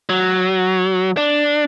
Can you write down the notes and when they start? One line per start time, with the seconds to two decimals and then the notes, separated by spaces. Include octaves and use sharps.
0.09 F#3
1.17 D4